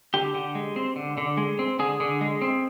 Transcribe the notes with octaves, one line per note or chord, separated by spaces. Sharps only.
D3 G4
D3
G#3
C4
D3
D3
G#3
C4
D3 G#4
D3
G#3
C4